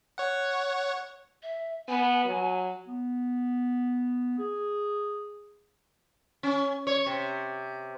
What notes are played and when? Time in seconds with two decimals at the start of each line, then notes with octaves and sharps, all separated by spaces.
0.18 C#5 F#5
1.43 E5
1.88 B3 G#5
2.25 F#3
2.88 B3
4.39 G#4
6.43 C#4
6.87 C#5
7.06 C3